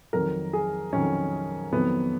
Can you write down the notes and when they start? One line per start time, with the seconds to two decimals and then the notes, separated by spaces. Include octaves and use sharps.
0.13 F2 D#3 F#3 A#4
0.53 G#4
0.92 F2 D#3 F#3 C#4
1.73 F2 D#3 F#3 B3